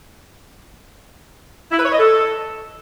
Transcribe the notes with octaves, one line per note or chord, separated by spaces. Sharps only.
E4
B4
C#5
D#5
A4